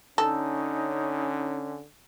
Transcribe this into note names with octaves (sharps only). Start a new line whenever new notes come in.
D3 C#4 D#4 A4